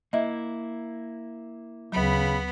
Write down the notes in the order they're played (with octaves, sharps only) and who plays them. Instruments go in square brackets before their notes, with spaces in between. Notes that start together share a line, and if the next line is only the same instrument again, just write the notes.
[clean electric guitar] A#3 E4 [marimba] D#5 E5
[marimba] D2 F#3 [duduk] C#3 [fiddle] B3 B5